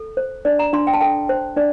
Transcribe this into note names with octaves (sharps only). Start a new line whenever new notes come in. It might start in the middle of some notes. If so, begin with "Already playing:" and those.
Already playing: A4
C5
D4 D5
A#5
D4 C6
G5
A5
A4 G5
C5
D4 D5